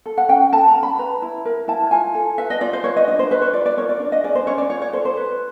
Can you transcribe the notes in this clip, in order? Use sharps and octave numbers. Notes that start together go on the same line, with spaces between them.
A4
F#5
C#4 G5
A4 A5
A#5
C#4
B5
B4 A#5
E4
A#4
E4 A5
F4 G#5
A4
B4 E5
D#5
F4 D5
C5
B4 C#5
D#5
D4 D#5
C5
B4 C5
C#5
F4 D5
D5
A#4 C#5
D5
D4
D#5
G#4 D5
C5
C#4 C#5
D5
F4 C#5
C#5
A4 C5
C5
B4